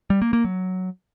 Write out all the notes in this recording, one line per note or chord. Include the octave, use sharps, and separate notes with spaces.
G3
A#3
A#3
F#3